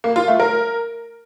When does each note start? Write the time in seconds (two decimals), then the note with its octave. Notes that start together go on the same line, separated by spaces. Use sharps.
0.04 A#3
0.16 F4
0.28 A3
0.40 A#4